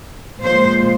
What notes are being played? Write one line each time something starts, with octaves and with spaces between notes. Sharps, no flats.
A#2 F3 G#3 C5